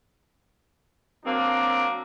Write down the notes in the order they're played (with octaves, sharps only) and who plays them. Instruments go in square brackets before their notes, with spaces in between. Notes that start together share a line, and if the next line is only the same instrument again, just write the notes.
[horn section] F#3 A#3 C4 D4